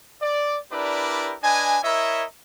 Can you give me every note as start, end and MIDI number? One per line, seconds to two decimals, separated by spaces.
0.21 0.58 74
0.71 1.35 62
0.71 1.35 64
0.71 1.35 67
0.71 1.35 70
0.71 1.35 71
0.71 1.35 74
1.42 1.77 62
1.42 1.77 71
1.42 1.77 75
1.42 1.77 80
1.83 2.24 64
1.83 2.24 70
1.83 2.24 73
1.83 2.24 75
1.83 2.24 76